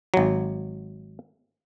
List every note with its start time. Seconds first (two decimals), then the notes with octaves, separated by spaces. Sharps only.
0.14 G#1 F#3